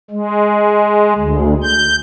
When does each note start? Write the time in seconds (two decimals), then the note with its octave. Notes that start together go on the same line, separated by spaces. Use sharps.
0.11 G#3
1.18 D2
1.63 G6